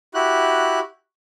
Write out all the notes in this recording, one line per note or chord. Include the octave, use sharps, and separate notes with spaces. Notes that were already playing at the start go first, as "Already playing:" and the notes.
E4 F#4 G4 F#6